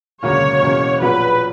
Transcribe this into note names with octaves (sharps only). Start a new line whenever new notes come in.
E1 D2 C#3 F#3 A#3 C#5
E2 B2 A#3 C#4
A#1 A#2 F#3 B3 F#4 B4